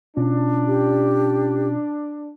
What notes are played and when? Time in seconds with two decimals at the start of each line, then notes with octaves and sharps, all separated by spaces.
0.17 B2 C#4 D4 F4
0.67 G4